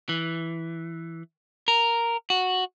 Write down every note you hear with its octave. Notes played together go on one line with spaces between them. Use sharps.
E3
A#4
F#4